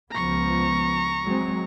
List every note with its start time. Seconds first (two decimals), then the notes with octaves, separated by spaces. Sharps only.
0.12 C#2 F3 B3 A#5 C#6
1.25 F#3 G#3 C4